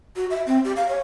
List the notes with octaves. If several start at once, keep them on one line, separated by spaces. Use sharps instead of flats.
F#4
E5
C4
G4
F5
C#5